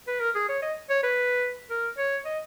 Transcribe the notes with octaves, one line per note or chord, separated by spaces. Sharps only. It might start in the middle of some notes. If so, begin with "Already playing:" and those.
B4
A#4
G#4
C#5
D#5
C#5
B4
A#4
C#5
D#5